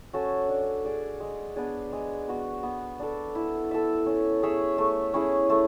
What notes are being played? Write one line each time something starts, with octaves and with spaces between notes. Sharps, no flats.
C#4 F#4 A4
D4
G#4 D5
G#3
B3 D4 G#4
G#3
B3 F#4
B3
D4 A4
E4
A4 E5
C#4
G#4 C#5 E5
A3
C#4 E4 G#4
A3